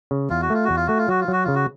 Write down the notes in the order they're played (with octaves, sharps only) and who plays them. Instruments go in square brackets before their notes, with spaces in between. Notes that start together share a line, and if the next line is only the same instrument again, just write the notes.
[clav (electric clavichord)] C#3
[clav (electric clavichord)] E2 [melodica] F4
[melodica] F#4
[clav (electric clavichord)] A3 [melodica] F4
[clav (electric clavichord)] E2 [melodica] F#4
[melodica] F4
[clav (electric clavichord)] A3 [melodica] F#4
[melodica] F4
[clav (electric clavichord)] F#3 [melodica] F#4
[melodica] F4
[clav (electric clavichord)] F#3 [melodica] F#4
[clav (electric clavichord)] C#3 [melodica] F4
[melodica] F#4